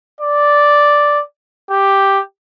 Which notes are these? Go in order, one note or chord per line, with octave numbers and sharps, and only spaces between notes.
D5
G4